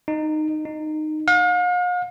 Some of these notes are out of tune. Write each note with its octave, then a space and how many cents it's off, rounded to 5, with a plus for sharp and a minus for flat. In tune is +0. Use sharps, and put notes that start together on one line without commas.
D#4 -15
D#4 -15
F5 +45